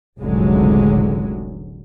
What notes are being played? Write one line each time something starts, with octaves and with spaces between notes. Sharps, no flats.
F1 C#2 A2 D3 F#3 G#3